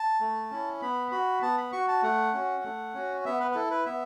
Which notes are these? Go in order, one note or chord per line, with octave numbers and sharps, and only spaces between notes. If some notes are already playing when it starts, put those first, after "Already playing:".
Already playing: A5
A3
C#4 E4
B3 B5
F#4 B5
B3 A5
B5
F#4 C#6
A5
A3 F#5
C#4 F#4
A3
C#4 F#4
B3 E5
B4
B4
E4 A4
B4
B3 E5